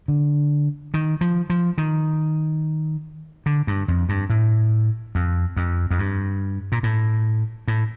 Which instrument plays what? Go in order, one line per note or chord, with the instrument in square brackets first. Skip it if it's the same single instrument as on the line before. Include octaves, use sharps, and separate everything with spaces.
[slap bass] D3
D#3
F3
F3
D#3
D3
G2
F2
G2
A2
F2
F2
F2
G2
A#2
A2
A2